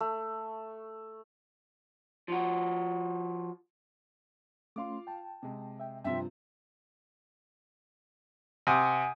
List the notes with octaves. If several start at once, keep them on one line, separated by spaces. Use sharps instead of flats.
A3
F3 F#4
A3 C#4 F4 F5 C6 D6
G5 A5
C3 G#3
E5 G5
G2 C3 F3 E5 G5 C6
C3 F#5 G#5 D#6